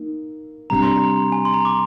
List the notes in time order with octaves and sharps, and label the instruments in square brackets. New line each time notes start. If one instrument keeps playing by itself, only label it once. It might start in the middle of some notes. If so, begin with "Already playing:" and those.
Already playing: [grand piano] A#3 D#4
[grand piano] C3 G3 D4 [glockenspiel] A#5
[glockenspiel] C6
A#5
G#5
C6
A#5
D6